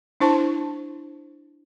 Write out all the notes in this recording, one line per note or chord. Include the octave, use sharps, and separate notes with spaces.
D4 E4 C5 A5 C#6